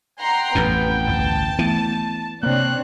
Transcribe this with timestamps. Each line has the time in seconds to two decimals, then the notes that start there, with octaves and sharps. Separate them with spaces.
0.19 F#5 G5 A#5 C6
0.55 A1 F2 A2 B3
1.08 G1 D2 A5
1.59 E3 A3 B3
2.43 C3 A#3 C4 D4 C#5 F#6